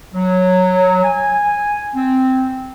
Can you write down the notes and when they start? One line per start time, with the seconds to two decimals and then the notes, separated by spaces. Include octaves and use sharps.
0.13 F#3
1.03 G#5
1.94 C4